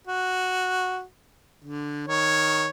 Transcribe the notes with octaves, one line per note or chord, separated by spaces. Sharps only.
F#4
D3
D#3 C#5